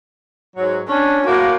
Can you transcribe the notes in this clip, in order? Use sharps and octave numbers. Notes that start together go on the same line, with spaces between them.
G#2 F#3
C#4 D4
A2 A#3 F#4